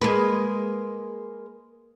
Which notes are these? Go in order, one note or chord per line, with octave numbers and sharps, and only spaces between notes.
G#3 A#3 B4